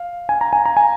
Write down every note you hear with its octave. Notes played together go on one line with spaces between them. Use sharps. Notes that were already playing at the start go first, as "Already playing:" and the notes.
Already playing: F5
G#5
A#5
G#5
A#5
G#5